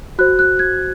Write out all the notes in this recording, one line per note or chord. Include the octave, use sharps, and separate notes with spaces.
F#4 C5 F#6
F#6
G#6